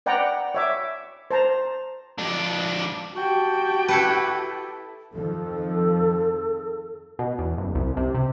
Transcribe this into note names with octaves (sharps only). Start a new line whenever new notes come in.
B4 D5 F#5 G5 A#5
C#5 E5 D6
C5 A5 A#5
F2 D4
F#4 G4 G5 A5
E4 A4 B4
F2 D#3 F3 A4
B2
E2
F#1
C2
C3
C3